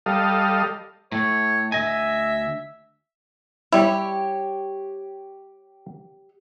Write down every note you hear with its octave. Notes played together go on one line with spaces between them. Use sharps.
G3 A4 D#5 F5
A2 A3 C#5
D2 D#5 E5 G#5
G3 E4 G4 C#5